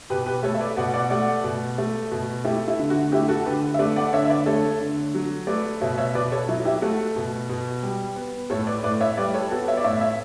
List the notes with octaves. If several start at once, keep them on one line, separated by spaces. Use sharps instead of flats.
B2 G4 B4
G4 B4
A3 A4 C#5
E5
B4 D5
B2 D5 F#5
D5 F#5
A3 D5 F#5
B2
A3
B2
A3 E4 G4
E4
D3
F#4
A3 E4 G4
F#4 A4
D3 G4 B4
E5
A3 B4 D5
D5 F#5
D3 C#5 E5
E5
B4 D5
A3 A4 C#5
D3
F#3
A3 B4 D5
B2 C#5 E5
C#5 E5
B2 B4 D5
A4 C#5
F#3 E4
E4 G4
A3 F#4 A4
B2
B2
G3
B3
A2 A4 C#5
B4 D5
A2 B4 D5
C#5 E5
G3 B4 D5
A4 C#5
B3 F#4 A4
C#5 E5
D5
A2 C#5 E5
C#5 E5